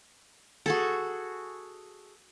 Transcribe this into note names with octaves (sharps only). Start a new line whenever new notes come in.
F#4 G#4 A4